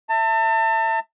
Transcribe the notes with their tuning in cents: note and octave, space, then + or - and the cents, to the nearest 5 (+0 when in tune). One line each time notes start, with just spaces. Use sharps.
E5 +0 A5 +35